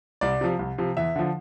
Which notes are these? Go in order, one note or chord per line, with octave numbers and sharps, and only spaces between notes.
C2 D5
C3 F3
C2
C3 F3
E2 E5
D3 F3